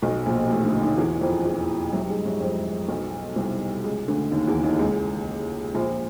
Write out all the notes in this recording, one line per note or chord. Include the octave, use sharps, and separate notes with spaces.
B1 B2
A#1 A#2
A1 A2
D2 D3
D#2 D#3
E2 E3
F2 F3
E2 E3
F#2 F#3
G3
G#2 G#3
F#2 F#3
F2 F3
B1 B2
C2 C3
C#2 C#3
D2 D3
D#2 D#3
E2 E3
D#2 D#3
C#2 C#3
A#1 A#2